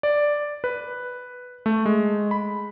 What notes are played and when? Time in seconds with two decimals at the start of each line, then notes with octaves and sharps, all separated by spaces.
0.03 D5
0.64 B4
1.66 A3
1.86 G#3
2.31 B5